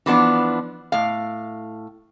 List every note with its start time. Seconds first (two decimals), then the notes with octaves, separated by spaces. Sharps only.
0.06 E3 F3 B3 D4
0.92 A2 F5